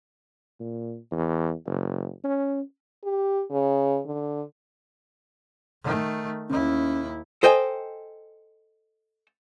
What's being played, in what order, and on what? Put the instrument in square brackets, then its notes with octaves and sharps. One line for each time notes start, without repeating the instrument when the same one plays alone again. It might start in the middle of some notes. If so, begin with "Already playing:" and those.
[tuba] A#2
E2
F#1
C#4
[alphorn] G4
C#3
D3
[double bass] D#3 A3
[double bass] D#2 E4 [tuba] C#4
[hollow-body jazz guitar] A4 C5 D#5 G5 G#5